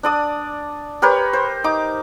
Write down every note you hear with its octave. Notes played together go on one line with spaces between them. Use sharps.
D4 D5 D#6
G4 A#4 B4 C#5
C5
D#4 D6